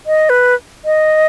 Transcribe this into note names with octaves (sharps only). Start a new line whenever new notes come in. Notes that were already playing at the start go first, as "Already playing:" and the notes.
D#5
B4
D#5